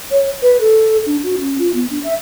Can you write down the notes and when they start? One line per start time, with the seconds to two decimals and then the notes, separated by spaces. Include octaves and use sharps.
0.11 C#5
0.42 B4
0.60 A4
1.06 D4
1.23 F#4
1.37 C#4
1.59 F4
1.74 B3
1.90 D4
2.04 E5